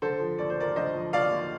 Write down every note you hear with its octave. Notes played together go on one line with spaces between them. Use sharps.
D3 A4 C5
F3
D#2 D5
C5
D#2 A#4 D5
D3 C5 D#5
F3
D#2 D5 F5
D#2